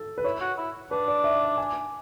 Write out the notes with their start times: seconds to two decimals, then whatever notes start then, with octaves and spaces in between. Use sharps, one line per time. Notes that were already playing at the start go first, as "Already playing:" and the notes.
Already playing: A4
0.18 B4
0.24 E4 C#5
0.41 F#4
0.58 E4
0.91 D4 B4
1.08 D5
1.24 E5
1.58 G#5